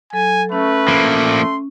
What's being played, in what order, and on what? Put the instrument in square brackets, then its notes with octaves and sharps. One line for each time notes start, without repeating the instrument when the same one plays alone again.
[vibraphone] F#3 A4 [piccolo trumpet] G#5
[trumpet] A3 [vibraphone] C#4 [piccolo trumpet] B4
[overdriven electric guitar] F3 A#3
[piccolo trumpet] C6